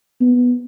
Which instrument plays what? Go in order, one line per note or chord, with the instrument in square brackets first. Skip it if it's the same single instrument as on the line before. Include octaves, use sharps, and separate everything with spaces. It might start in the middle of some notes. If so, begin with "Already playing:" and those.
[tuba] B3